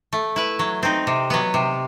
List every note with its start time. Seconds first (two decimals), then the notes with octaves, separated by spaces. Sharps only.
0.13 A3
0.36 E4 B4
0.59 F#3
0.83 C4 D#4
1.07 C3
1.30 F#3 B3
1.54 C3